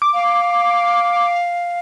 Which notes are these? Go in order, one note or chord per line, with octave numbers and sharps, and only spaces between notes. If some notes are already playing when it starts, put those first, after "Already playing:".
D6
F5